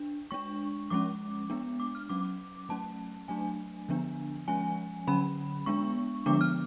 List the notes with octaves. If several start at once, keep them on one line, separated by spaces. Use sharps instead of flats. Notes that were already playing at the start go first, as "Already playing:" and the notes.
Already playing: D4
G#3 D4 C#6
F3 G#3 C#4 D6
G#3 B3 D4
D6
F6
F#3 C#4 D6
F#3 A3 C#4 A5
F#3 A3 D4 G#5
D3 F3 B3 D4
F3 G#3 C#4 G#5
D3 F#3 C#4 B5
G#3 B3 D4 C#6
D3 F3 G#3 B3 D4 D6
F6